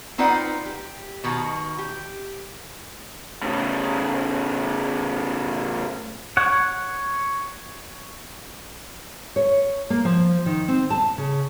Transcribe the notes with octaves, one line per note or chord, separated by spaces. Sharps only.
C4 D#4 F4 B4 D5 F#5
G4
B2 D#3 F#4
G4
A2 C#3
C#5 F#5
C#5
A#3
F3
D#3
C4
A5
C#3